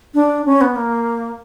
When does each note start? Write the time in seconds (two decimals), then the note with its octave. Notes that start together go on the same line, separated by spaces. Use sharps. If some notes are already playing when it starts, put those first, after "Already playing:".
0.14 D4
0.46 C#4
0.61 B3
0.76 A#3